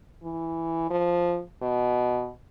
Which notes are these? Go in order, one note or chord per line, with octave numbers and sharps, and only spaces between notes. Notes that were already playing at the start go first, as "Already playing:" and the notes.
E3
F3
B2